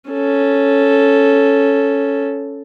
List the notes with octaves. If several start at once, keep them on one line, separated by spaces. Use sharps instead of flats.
C#4 A4